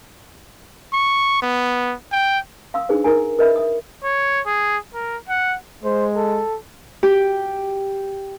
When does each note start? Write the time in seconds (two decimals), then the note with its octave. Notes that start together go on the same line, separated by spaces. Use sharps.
0.93 C#6
1.42 B3
2.12 G5
2.74 F5 C6 D#6 E6
2.89 D4 D#4 G#4 B4 C5
3.04 D#4 E4 A#4 G#5
3.39 A#4 B4 D#5 E5 B5
3.56 E5 D#6
4.04 C#5
4.47 G#4
4.94 A#4
5.29 F#5
5.84 G#3 C5
6.16 A4
7.03 G4